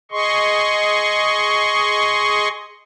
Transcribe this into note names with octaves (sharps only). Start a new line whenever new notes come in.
G#4 D#5 C6 C#6